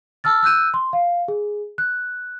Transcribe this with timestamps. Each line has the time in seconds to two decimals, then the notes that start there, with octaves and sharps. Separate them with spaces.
0.24 A5 E6 F6 A6
0.43 E6 F#6 G6 D#7
0.74 C6
0.93 F5
1.28 G#4
1.78 F#6